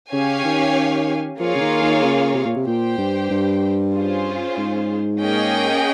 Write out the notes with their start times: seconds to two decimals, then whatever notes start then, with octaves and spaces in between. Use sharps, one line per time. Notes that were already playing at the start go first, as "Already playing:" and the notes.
0.12 C#3 C#4 G4 C#5 F5 G#5
0.44 D#3
1.39 F3 A#3 F4 G#4 C#5 F5
1.55 C#3
1.61 D#3
1.82 D#3
2.03 C#3
2.35 C3
2.45 A#2
2.56 C3
2.66 A#2 G4 C5 G5
2.98 G2
3.31 G2
3.94 C#4 F4 G#4 C5
4.58 G#2
5.21 A#3 C#4 G#4 D#5 G5